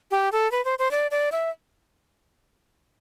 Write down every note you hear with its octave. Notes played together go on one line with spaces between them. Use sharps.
G4
A4
B4
C5
C5
D5
D5
E5